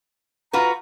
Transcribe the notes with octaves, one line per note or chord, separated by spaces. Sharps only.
F4 F#4 B4 A#5